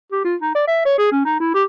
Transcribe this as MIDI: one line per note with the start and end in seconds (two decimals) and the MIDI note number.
0.12 0.22 67
0.24 0.35 65
0.41 0.51 63
0.55 0.65 74
0.67 0.83 76
0.85 0.95 73
0.98 1.07 68
1.12 1.21 61
1.25 1.38 63
1.40 1.50 64
1.54 1.63 67